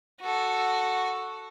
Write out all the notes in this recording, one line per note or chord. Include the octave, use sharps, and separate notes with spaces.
F#4 A4